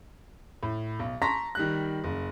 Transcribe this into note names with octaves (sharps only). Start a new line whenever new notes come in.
A2
B1
A5 A#5 C6 C#6 A#6 B6
D#3 G3 F#6
F#1